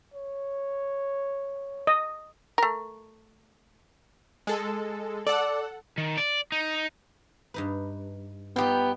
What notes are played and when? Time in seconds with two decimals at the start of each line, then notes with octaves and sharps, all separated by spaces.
0.14 C#5
1.87 D#5
2.58 A3 A#4
4.47 G#3 A4
5.27 A4 D5 F#5
5.98 D#3
6.17 D5
6.52 D#4
7.54 G2 D#4 B4
8.56 G3 B3 D#4 F4 G4 G5